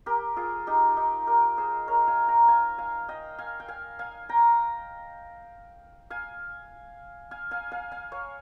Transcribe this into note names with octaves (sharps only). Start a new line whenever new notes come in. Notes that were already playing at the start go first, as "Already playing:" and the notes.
G4 A#4
F4 G#4
D#4 G4
D#4 G4
G4 A#4
G#4 C5
A#4 C#5
F5 G#5
G5 A#5
F5 G#5
F5 G#5
D#5 G5
F5 G#5
G5
F5 G#5
F5 G#5
G5 A#5
F5 G#5
F5 G#5
F5 G#5
F5 G#5
F5 G#5
C#5 F5